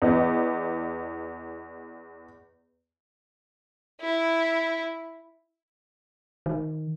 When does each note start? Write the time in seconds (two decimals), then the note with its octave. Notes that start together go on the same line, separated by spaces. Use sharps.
0.02 E2 D#5
4.01 E4
6.46 D#3